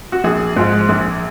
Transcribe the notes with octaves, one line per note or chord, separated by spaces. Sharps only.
F#4
A#1 G#4
G#2 F3 G#3
A#1